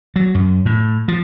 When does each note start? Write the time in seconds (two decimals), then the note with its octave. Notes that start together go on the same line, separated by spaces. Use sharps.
0.16 F#3
0.35 F#2
0.66 A2
1.08 F3